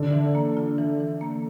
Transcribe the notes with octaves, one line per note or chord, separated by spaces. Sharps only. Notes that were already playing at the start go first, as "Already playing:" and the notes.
Already playing: D3
E3
A#3
F4
E3
E3
A#3